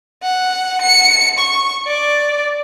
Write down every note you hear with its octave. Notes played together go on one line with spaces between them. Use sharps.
F#5
C#7
C#6
D5